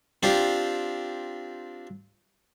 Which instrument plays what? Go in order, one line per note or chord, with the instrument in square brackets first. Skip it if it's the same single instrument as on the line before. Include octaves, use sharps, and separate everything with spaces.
[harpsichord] C4 D4 F4 G4